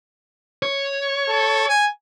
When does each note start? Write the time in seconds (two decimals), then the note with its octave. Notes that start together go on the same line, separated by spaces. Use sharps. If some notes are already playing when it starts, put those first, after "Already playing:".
0.63 C#5
1.28 A4
1.68 G#5